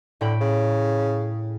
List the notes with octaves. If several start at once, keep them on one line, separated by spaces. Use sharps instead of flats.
A2 D3 G5 B5
C#3